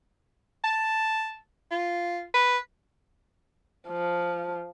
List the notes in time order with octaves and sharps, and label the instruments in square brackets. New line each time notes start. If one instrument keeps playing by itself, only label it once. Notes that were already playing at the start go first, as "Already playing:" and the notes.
[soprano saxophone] A5
F4
B4
[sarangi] F3